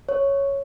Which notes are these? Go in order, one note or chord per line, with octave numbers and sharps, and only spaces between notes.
C#5